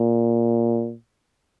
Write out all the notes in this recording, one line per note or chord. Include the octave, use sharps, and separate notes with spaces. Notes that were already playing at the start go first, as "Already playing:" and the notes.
Already playing: A#2